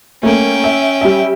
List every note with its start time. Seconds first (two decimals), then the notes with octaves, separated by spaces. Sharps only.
0.23 A3 A#3 C#4 G5
0.64 E5
1.01 G3 E5